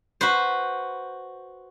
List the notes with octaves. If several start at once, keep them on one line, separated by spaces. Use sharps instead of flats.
F#4 B4 C5